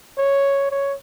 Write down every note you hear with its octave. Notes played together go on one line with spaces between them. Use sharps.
C#5
C#5